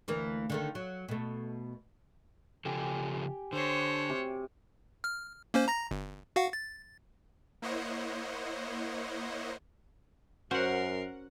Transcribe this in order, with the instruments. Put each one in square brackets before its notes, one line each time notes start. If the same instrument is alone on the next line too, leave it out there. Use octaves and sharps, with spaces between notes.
[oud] D2 E3 A#3
D3 D#3 A3
F#3
B2 A3
[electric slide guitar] C#3 F3 A4 [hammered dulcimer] G4 G5 G#5
[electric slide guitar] D3 [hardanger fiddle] C5 C#5
[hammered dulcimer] C3
[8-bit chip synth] F6
A#3 C#4 C5
A#5 A#6
G1
F#4 F5 F#5
A6
[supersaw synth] A#3 E4 C5 C#5 D#5 F#5
[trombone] F#2 [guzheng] C#4 C5 [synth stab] F#4 F#5 [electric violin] A#4 C7